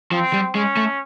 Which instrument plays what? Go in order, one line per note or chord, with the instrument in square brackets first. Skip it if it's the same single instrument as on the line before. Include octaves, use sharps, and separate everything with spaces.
[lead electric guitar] F3 [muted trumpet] C4
[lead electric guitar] G3
[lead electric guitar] G#3 [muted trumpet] C#4
[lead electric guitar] A3